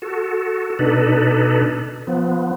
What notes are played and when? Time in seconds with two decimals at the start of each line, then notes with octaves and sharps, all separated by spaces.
0.02 F#4 A4
0.79 B2 D4 D#4 A4 B4
2.07 F3 B3